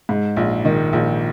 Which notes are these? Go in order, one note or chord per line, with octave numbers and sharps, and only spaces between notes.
G#2
A#1
D#3
A#1